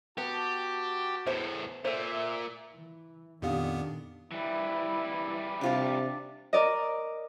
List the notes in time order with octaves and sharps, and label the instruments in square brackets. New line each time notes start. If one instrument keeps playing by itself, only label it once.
[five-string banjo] B3 [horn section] F#4 A5 [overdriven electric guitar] G4
[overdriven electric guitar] E2 A2 [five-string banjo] B3 C5 E5
[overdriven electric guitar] A#2 [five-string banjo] A4 C5 [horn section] E5
[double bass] E3
[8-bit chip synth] F2 A#2 B3 [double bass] D#3 D4 [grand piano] G4 F5 D#6
[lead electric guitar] E3 G3 [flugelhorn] E4
[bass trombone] C3 [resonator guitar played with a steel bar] D4 F4 G4
[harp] A#4 D5 D#5